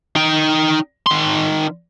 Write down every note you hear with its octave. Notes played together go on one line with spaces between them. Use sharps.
D#4 G5
D#3 C6